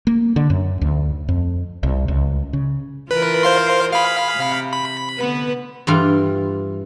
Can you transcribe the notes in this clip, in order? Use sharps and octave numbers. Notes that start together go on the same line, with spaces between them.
A#3
D3
F#2
D2
F2
C2
C#2
C#3
E3 F4 A#4 B4
C5 F5 C6
G#4 F5 B5
C3
B5
D3 B3 B4
G2 E3 F4